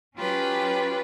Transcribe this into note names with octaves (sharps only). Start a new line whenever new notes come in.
F#3 C#4 F4 G4 B4